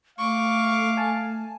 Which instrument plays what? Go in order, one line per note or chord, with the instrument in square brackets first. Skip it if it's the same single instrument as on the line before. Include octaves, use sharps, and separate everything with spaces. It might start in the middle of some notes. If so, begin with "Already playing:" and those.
[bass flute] A3 [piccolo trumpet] F5 [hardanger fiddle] C#6 D6
[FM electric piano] G#5 A5